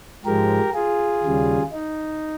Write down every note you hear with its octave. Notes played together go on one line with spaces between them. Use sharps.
G#2 F3 G#3 G4 A#4
F4 G#4
D#2 C#3 G3
D#4